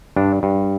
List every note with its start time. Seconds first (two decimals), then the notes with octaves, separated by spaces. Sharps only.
0.16 G2 D4
0.43 G2